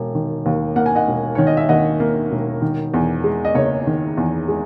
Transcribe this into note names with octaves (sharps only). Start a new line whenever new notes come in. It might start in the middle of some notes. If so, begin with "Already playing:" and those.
Already playing: E1
D#3
D#2
A#3 F#5
G#5
D#5 F#5
E1
D#3 C#5
D#5
E5
D#2 D#5 F#5
A#3
E1
D#3
E2
G#3
D#5
F#1 C#5
D#3
E2
G#3